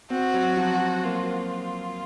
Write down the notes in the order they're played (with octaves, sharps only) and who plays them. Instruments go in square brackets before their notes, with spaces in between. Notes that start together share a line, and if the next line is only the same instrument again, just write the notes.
[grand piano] C4 [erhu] F#4
[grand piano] F#3
F3
F#3
[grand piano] A#3 [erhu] F4